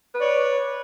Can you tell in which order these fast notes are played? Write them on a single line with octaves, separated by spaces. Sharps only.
B4 D5 C#5